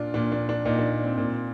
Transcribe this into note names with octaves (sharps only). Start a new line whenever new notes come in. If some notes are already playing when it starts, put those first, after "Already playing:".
Already playing: A#2 D4 F4
A#2 D4
D4
D4
A#2 D#4
D4
C4
A#2